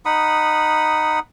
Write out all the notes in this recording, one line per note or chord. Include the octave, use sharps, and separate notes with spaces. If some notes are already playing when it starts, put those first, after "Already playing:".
D#4 F#5 B5 D#6